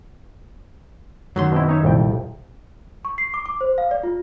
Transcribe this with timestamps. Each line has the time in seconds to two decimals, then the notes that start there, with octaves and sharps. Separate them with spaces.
1.36 F#2 D#3 F#3 C6
1.52 B2 C4 E4
1.69 D#4 C#5 E5
1.83 C2 F2 A#2 G5
3.05 C#6
3.18 C7
3.34 D6
3.46 D6
3.61 C5
3.78 F5
3.91 D5
4.03 F4